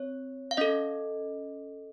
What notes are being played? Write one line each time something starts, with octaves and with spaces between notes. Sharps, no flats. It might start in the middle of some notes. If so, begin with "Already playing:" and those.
Already playing: C4 C#5
F5
C#4 A4 D#5